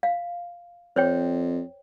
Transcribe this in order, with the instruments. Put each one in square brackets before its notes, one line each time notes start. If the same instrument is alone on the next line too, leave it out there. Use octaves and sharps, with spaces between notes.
[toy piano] F5
[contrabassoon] F2 [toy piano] C5 C#5 G5